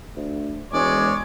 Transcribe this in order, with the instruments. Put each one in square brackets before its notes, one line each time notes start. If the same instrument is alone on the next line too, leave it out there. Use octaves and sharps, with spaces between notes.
[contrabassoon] D2
[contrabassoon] E1 [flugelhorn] G#3 [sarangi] C#5 [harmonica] D5